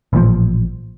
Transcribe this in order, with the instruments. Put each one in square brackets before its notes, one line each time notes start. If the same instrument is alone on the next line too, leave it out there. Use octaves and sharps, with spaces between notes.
[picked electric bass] A1 A#2 D#3 F3